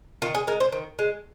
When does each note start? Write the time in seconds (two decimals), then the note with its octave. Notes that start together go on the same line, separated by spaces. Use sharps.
0.22 D#3 F4
0.35 G#4
0.47 G#3 A#4
0.60 C5
0.72 D#3
0.99 G#3